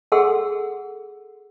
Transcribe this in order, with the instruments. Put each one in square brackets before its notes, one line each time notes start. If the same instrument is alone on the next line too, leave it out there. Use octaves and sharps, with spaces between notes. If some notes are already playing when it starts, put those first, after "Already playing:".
[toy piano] G#4 A4 F#5 C6 E6